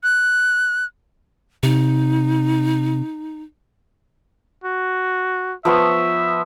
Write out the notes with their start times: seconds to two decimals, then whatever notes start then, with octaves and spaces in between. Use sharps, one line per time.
0.03 F#6
1.63 C3 D#4
4.64 F#4
5.65 F3 B3 E5 C#6